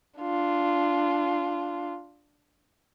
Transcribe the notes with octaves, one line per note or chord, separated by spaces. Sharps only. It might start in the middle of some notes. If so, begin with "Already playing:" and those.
D4 F4